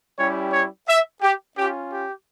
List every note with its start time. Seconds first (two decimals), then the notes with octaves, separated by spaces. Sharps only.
0.19 G3 C#4 E4 G4 C#5
0.53 C#5
0.88 E5
1.22 G4
1.58 C#4 F4 G4
1.92 G4